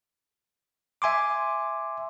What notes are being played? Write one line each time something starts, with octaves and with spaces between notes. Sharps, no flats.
E5 G#5 C6 D6